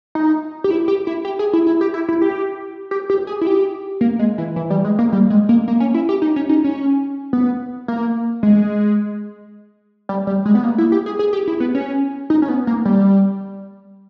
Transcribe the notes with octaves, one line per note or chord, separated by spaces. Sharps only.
D#4
G4
E4
G4
E4
G4
G#4
E4
E4
G4
E4
E4
G4
G4
G4
G#4
E4
G4
A#3
G#3
E3
E3
G3
G#3
A#3
G3
G#3
A#3
A#3
C#4
E4
G4
D#4
C#4
D#4
C#4
B3
A#3
G#3
G3
G3
G#3
B3
A#3
E4
G4
G#4
G#4
G4
E4
B3
C#4
D#4
C#4
B3
A#3
G3